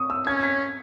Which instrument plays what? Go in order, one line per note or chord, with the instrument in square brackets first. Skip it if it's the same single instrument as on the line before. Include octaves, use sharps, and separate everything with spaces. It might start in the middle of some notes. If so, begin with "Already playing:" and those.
Already playing: [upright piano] C#6 D#6
E6
[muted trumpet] C#4 [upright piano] G#6
[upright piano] B6